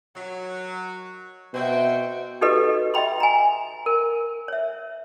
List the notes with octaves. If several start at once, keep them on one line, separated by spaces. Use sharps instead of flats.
D#3 F#3
B2 C4 E4 F#4 C5 E5 G5
D#4 F#4 G4 A4 B4 D#5
D#5 E5 G5 B5 C6
G#5 A#5
A#4
C#5 E5